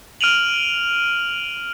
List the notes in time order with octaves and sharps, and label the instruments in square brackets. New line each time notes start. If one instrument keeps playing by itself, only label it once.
[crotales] F6 D7 D#7 F7 F#7